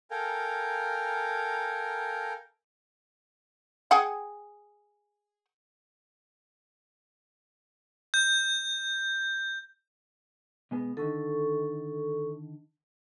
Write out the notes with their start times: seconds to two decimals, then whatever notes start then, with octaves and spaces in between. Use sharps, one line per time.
0.11 A4 A#4 F5 G5 G#5 A#5
3.91 G#4 F#5 G5
8.14 G6
10.71 B2 G#3 B3
10.97 D3 D#3 A4 C#6